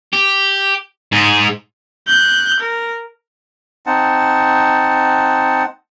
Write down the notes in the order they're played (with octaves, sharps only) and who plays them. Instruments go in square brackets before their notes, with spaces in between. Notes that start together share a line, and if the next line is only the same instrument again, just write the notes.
[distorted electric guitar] G4
G#2 G#4
[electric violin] F#6 G6
A#4
[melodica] C4 D#4 F#5 A5